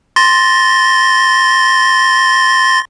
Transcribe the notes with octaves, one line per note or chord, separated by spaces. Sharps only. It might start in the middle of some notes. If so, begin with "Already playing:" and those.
C6 A6 A#6